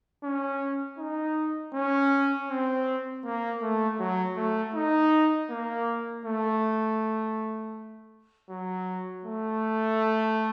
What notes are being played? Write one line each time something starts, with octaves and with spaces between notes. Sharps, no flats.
C#4
D#4
C#4
C4
A#3
A3
F#3
A3
D#4
A#3
A3
F#3
A3